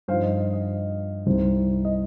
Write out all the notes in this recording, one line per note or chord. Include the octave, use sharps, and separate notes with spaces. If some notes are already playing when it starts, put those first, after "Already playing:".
G2 F3 D#4 C5 F5
D#5
D#5
D#5
C2 C3 G3 C4 D#4 C5
D#5